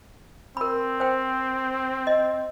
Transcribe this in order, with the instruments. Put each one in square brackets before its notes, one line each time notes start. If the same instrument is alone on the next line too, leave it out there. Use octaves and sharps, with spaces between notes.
[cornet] C4 [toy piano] A#4 B5
[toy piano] C5 G5
D#5